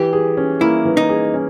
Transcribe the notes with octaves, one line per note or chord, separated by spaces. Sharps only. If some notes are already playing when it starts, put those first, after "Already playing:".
Already playing: E3 G4
G#4
C#4
A#3 E4
E3
D#4
G#4
C#4